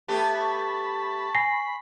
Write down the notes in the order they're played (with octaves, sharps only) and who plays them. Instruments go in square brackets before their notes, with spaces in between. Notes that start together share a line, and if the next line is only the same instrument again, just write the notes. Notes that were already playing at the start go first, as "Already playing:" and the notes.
[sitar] A3 B3 G4 [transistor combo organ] A5 B5
[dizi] C#6
[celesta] G#5 A#6 C7 [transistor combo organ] B5